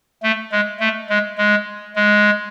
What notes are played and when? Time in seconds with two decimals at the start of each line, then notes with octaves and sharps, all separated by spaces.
0.23 A3
0.52 G#3
0.80 A3
1.10 G#3
1.38 G#3
1.96 G#3